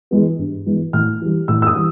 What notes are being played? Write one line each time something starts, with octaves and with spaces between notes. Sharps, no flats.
E3 G#3 B3
G2
E3 G#3 B3
A2 F6
E3 G3
A2 E6
E6
D#6
E3 G3